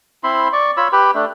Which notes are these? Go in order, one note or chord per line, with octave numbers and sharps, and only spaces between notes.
C4 E4 B5 C6
D5 C#6
F4 C#5 B5 E6
G4 B4 B5
A3 D4